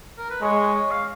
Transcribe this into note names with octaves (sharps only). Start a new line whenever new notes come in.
A#4
B4
G#3 C#5
F5